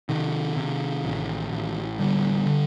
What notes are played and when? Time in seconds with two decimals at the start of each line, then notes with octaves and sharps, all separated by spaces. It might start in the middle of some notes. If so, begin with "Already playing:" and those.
0.09 C3 D#3
0.57 C3
1.04 A1
1.51 A1
1.99 D3 G3
2.46 D3